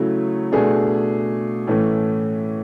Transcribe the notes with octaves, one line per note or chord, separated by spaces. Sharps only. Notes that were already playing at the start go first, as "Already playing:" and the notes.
Already playing: C#3 F#3 A3 E4
B2 A3 D4 G#4
A2 E3 A3 C#4